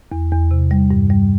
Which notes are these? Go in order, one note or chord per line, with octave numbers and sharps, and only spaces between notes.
E2
E2
C3
G3
G2
G3